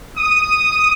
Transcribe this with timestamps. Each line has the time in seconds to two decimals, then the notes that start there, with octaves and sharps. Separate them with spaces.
0.16 D#6